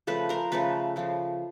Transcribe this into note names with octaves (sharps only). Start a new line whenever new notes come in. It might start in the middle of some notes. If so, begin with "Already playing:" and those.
C#3 F3 A3 A4 B4
A#4 C5
C#3 F3 A3 A4 B4
C#3 F3 A3